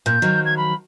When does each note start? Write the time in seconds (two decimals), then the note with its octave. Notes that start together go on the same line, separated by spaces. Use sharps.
0.06 A#2 G6
0.22 D#3 F3 F#3
0.45 G#6
0.57 B5